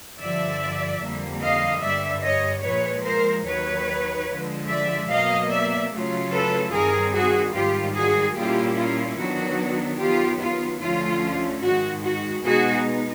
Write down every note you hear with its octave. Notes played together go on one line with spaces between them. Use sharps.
G2 D3 F3 D5 E5
F2 D3 G3 A#3
D#5 F5
G2 D3 G3 D5 E5
C#5 D#5
A#2 F3 G#3 B4 C#5
A#4 C5
D#2 D#3 F#3 B4 C#5
D3 F3 G#3
D5 E5
B2 F#3 A#3 D#5 F5
D5 E5
C#3 F#3 A3 C#4 F4
A4 B4
G2 D#3 G3 C4 G#4 A#4
F#4 G#4
G#2 D#3 G3 F4 G4
F#4 G#4
A#2 G3 A#3 C#4 E4 F4 G4
F4
D#3 F#3 B3 D4 F#4
D#3 F#3 B3 F4 G4
F4
D2 D3 F3 A3 C#4 F4
G#2 D#3 G#3 F#4
F#4
B2 G#3 B3 D#4 F#4 G#4